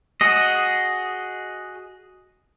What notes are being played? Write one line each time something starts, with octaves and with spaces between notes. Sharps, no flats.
F#4 G#4 D#5